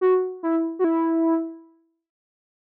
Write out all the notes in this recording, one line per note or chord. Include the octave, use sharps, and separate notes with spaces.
F#4
E4
F#4
E4